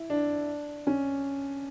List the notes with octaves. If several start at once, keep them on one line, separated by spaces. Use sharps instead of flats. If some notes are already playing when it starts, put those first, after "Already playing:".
Already playing: E4
D4
C#4